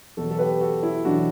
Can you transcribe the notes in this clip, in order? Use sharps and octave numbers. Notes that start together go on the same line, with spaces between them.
E2 B2 F#3 F#4 A4
A4
G4 B4
F#4 A4
E4
E2 B2 F#3 D4 F#4